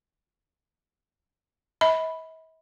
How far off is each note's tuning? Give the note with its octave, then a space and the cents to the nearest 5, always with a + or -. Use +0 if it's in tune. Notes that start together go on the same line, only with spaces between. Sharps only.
E5 -45 B5 +0